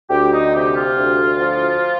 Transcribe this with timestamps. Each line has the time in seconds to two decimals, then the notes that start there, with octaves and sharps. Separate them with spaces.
0.09 D2 G4
0.32 D#4
0.53 C3 G4
0.74 F4
0.97 D2
1.40 F3